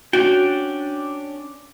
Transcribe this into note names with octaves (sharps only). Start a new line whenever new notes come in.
C#4 D4 F#4 G5